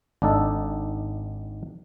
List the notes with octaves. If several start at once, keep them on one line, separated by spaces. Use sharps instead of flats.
G#1 D4 D#4 A4